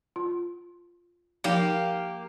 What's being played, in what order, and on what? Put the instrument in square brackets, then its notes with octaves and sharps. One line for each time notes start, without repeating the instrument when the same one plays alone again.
[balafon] F4
[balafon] F3 D#4 [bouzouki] A#3 G4